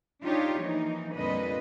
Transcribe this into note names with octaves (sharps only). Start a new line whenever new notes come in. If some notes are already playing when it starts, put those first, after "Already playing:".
D4 D#4 F4 G4 C#5
E3 F3 A#3 D#4
F2 A#2 D3 G3 B4 D#5